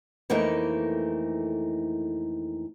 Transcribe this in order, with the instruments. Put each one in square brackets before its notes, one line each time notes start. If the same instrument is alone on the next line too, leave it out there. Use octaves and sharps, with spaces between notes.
[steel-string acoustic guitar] F2 E3 A3 A#3 D#4